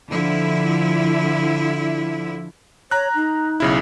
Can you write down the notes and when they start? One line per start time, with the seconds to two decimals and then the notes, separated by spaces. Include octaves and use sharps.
0.11 D3 F3 E4
2.91 C#5 A#5 F#6
3.15 D#4
3.60 B1 C#3 E4